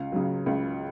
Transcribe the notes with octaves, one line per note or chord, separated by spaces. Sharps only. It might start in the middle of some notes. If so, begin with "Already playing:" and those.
Already playing: C#2 F5
C#3 F#3
C#2